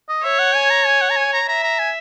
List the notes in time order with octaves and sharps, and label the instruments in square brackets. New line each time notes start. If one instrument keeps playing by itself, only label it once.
[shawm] D#5
[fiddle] C#5 [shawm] E5
[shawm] F#5
G#5
A#5
G#5
F#5
A#5
G#5
A#5
[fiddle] E5 [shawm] A#5
[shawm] A#5
G#5